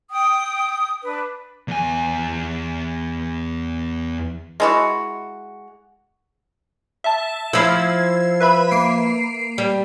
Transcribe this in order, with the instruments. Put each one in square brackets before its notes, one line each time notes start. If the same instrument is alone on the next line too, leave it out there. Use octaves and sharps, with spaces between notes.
[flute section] G5 D#6
D4 B4
[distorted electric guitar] E2 G#5
[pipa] G#3 E4 F#4
[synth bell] E5 A5
[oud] F3 E4 [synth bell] E6 G#6 C7
[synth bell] B4 E5 B5
A#3 C7 D7
[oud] G3